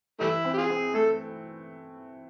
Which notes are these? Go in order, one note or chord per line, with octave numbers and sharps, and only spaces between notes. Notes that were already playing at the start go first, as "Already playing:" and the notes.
E3 G3 A3 E4
C4
G4
F4 G#4
C4
A3 A4